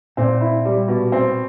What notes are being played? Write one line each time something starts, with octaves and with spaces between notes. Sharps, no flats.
A#2 C4
E4
G3
B2
C4